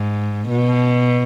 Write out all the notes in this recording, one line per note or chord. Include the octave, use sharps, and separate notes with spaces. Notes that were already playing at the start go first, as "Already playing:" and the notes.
Already playing: G#2
B2